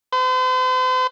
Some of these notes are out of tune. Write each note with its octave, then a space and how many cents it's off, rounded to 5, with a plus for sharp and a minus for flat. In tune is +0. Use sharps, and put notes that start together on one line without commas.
C5 -45